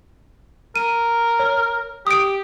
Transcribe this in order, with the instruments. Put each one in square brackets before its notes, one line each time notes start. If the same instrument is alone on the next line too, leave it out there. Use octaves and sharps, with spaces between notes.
[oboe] A#4 [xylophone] D#7
[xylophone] C#5
[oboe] G4 [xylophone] D#6 D7